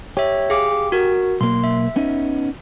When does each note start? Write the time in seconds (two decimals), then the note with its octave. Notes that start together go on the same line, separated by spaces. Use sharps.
0.17 G4 C#5 E5
0.50 G#4 F5 D6
0.92 F#4 A#4
1.41 B1 A#3 C6
1.64 E5
1.96 B3 C#4 D#4